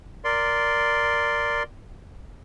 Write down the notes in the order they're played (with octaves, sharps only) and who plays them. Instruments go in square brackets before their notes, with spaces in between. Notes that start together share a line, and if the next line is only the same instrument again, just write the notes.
[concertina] A#4 D5 C6